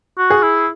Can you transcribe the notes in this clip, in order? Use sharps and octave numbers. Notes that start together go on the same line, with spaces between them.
F#4
G#4
E4